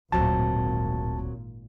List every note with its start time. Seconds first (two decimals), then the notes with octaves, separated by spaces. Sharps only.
0.12 D1 G#1 D2 A#2 F#3 C4 A5